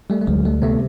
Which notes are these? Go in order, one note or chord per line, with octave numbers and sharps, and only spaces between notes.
G3 A3
A3
D2 F#3 G#3
G3 A3
C3 A3 B3